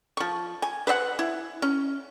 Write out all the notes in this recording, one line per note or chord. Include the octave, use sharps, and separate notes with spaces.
F3 C#6
G#5
B4 C5 D#5 F#5
E4
C#4